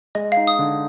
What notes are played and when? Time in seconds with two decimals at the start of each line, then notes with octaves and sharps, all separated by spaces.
0.15 G#3 D#5
0.32 F5
0.37 D#4
0.47 D#6
0.59 D3